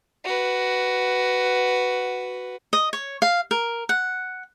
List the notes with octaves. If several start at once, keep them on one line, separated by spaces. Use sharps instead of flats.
F#4 B4
D#5
C#5
F5
A#4
F#5